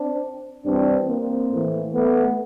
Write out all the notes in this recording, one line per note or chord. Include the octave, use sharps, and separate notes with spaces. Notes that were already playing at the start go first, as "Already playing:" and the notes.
Already playing: C4 D4
G2 E3 C4 D4
A#3 C4
A2 E3
A3 B3